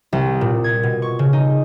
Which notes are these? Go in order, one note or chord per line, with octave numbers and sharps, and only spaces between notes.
C2
A#2
G#6
B2
C#6
C#3
D#4